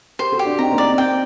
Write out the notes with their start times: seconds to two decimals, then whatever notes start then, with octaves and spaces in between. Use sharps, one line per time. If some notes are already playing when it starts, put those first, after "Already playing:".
0.19 G4 A#4 C5
0.32 F#4 A4
0.39 G4
0.45 D4 F#4
0.59 C4 D#4 A#5
0.72 A#3 D4
0.78 D5
0.85 C4
0.98 C4 G5